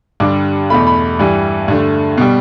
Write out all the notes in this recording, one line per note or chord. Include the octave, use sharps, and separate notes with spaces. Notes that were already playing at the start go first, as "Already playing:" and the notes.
G2 D3 G3 D6
E2 B2 A3 B5
B5
G2 E3 G3
G2 D3 A3
B2 G3